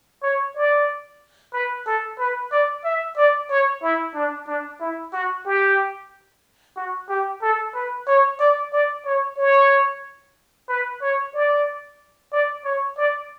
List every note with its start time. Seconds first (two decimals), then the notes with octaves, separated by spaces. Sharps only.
0.23 C#5
0.56 D5
1.53 B4
1.87 A4
2.19 B4
2.52 D5
2.85 E5
3.17 D5
3.50 C#5
3.83 E4
4.15 D4
4.47 D4
4.80 E4
5.13 F#4
5.46 G4
6.76 F#4
7.09 G4
7.42 A4
7.75 B4
8.07 C#5
8.40 D5
8.73 D5
9.06 C#5
9.38 C#5
10.69 B4
11.02 C#5
11.34 D5
12.32 D5
12.65 C#5
12.97 D5